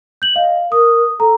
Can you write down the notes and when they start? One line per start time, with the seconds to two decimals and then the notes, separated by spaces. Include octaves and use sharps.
0.22 G6 F#7
0.36 D#5 F5
0.72 A#4 D#6
1.20 A4 A#5